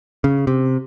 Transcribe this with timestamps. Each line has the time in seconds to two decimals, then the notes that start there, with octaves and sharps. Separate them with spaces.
0.24 C#3
0.47 C3